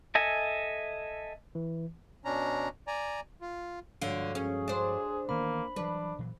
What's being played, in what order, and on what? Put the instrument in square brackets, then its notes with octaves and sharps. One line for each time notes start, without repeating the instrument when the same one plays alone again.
[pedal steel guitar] A4 D#5 E5 G#5
[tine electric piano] E3
[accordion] B2 C#4 D4 A#5
D5 G#5 A#5
F4
[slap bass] G2 F3 G#3 [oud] D3 F4 [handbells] F#4 C#5 F5
[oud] C#4 [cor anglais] G#4
[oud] D4 C5
[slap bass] D#3 E3 B3 [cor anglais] A#3 [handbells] B5
[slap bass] E3 F#3 G3 [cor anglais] D4 [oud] B4
[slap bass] A#2 E3 F#3